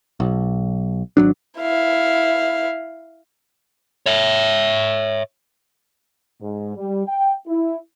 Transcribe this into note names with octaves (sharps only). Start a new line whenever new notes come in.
B1
G#1 F#3 D4
E4 F5
C#5 E5
G#2
G3
G5
E4